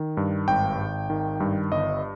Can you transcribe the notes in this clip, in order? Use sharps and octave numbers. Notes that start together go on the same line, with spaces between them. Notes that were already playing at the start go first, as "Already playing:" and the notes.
Already playing: D#3
G2
G#1 G5
G#1
D#3
G2
G1 D#5